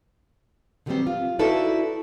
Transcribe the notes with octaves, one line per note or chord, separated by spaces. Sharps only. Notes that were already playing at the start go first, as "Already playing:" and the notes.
D3 D#3 F#3 G3 B3 C4
F4
D#4 E4 F#4 A4 B4 D5